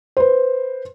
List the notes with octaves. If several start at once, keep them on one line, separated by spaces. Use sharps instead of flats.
B4 C5